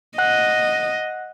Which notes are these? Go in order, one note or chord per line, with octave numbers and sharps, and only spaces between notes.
D#5 F#5 F#6